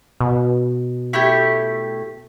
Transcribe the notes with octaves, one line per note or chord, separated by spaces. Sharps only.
B2
A3 E4 G4